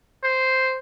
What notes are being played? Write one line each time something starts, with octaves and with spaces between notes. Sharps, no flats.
C5